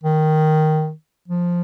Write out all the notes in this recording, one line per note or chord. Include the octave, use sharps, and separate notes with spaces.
D#3
F3